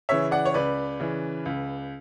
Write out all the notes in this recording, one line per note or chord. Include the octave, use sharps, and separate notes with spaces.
C#3 E3 C#5 E5
D5 F#5
C#5
C#2 B4 D5
C#3 E3
C#2